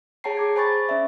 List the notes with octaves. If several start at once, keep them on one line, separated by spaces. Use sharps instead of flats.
G#4 C#5 G5 A5 A#5 C7
G#4 D6 G#6
C5 G#5 B5 C#6 A6
C#4 D5 E5